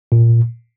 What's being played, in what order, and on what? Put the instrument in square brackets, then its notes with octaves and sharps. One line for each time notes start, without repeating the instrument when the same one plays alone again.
[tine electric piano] A#2